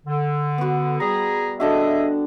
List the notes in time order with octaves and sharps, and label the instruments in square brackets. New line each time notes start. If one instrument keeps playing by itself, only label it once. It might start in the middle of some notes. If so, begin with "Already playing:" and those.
[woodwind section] D3
[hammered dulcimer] B3 F#4
[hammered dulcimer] G3 [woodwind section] G#4 A#5
[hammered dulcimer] D3 D4 F#4 [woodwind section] G#4 D#5 E5